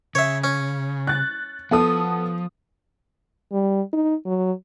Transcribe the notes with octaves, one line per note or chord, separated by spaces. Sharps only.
C#3 C#5 E5
C#4
F#6 A6
F3 B3 A4 D#6
G3
D#4
F#3